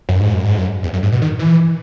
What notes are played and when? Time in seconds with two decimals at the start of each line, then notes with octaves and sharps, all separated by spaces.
0.09 F#2
0.20 G#2
0.34 F#2
0.45 G#2
0.58 F#2
0.83 E2
0.93 F#2
1.03 G#2
1.12 B2
1.22 D#3
1.39 E3